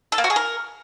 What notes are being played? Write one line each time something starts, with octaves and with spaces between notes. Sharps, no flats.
A4
A#3
F#4
G#4
A#4